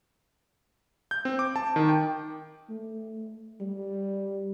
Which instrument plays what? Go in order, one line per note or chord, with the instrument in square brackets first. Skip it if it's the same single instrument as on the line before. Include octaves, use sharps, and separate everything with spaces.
[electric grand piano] G6
C4
D6
A5
D#3
G5
[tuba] A3
G3